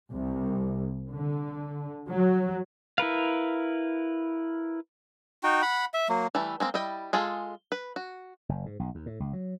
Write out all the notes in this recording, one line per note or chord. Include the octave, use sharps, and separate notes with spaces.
C2
D3
F#3
E4 A#4 B4 F5
D#4 F#4 G5
F#5 B5
E5
F#3 A#3
E3 G3 A3
G#3 A#3 C4
G3 E4 D#5 G5
G#3 F4 G#4 A4
B4
F#4
F#1
G#2
B1
D#2
A2
C#2
F#3